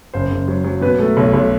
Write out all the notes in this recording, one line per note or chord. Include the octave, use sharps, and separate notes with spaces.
F#1 C5
F#1
F#3
F#3
B2 B4
A3
B1
B1